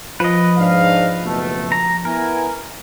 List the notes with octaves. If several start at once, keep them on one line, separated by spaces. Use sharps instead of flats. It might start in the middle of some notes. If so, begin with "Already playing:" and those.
F3 B4 D#5
G#2 D4 F5
F#1 B2 A3
A#5
B3 E4 A#4 G#5